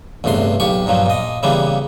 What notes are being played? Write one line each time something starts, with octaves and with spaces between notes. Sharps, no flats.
A1 E2 G2 C3 C6
B1 A#2 G4 C#6
G2 A#2 F3 F#3
A#2 D#5
C#3 E3 G3 A#3 B3